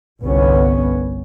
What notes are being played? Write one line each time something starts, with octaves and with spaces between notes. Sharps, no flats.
G1 C2 B3 C#4